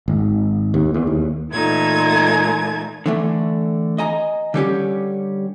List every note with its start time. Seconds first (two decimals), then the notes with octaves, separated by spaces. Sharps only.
0.08 G#1
0.74 D#2
0.94 E2
1.07 D#2
1.52 A#2 E3 A3 D#4 A5 G#6
3.06 D3 E3 A3
3.98 D#5 G#5 A#5
4.54 D3 G3 C#4 G4